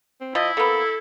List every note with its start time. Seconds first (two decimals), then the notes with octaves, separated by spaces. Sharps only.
0.21 C4
0.35 F3 E4 D#5
0.57 A#3 B3 A4